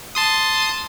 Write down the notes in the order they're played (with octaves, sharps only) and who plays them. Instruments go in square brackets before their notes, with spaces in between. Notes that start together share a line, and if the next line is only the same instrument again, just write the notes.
[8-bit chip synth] A5 C6 D#6